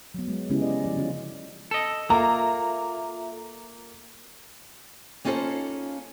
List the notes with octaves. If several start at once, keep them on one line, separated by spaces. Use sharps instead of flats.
F#3 B3
G#3
C#3 G#3 B3 C#4 E4 G4
D5 D#5
F3 F#3 D5
D3 C#4 F4
A4 D#5 E6
A#3 F4 A4 E5 A#5
A#3 C#4 D#4 F4 A4 C5